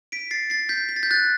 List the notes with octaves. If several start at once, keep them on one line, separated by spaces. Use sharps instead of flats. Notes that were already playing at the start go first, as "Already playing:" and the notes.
B6 D7
A6 C7
A6 C7
G6 B6
B6
A6
G6
F#6 A6